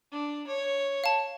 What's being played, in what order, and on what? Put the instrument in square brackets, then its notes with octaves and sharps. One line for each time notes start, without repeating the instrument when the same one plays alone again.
[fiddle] D4
C#5
[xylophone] F5 A5